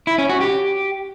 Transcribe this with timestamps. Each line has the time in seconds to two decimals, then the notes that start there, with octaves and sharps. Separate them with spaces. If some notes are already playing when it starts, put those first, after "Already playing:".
0.07 E4
0.18 C#4
0.30 F#4
0.41 G4